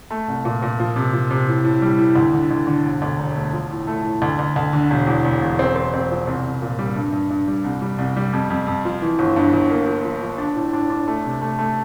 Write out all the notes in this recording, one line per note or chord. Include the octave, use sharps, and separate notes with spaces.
A3
C2
A#2
A#2
F3
C3
F3
C3
A2
A2
G3
A2
D2
D3
D2
D3
E1
D2
E1
A3
F3
A2
A3
A2
D2
D2
D2
D3
E1
E2
E1
E1
C4
C4
C4
F3
C2
C2
A#2
G3
G2
G2
G2
G3
C2
G3
C2
G3
F2
F2
F2
F3
E3
G1
G2
G1
A#3
F3
F3
F3
D4
A2
D4
D4
A3
C3
A3
A3